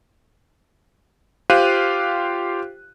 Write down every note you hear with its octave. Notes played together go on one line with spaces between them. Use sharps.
F4 G4 C5 F5 F#6 D#7